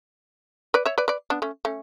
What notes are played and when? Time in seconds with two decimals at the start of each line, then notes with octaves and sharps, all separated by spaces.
0.74 B4 D5
0.85 C#5 E5
0.98 B4 D5
1.08 B4 D5
1.30 B3 D4
1.42 A3 C#4
1.65 A3 C#4